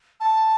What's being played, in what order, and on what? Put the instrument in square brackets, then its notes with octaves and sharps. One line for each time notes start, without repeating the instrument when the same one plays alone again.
[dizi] A5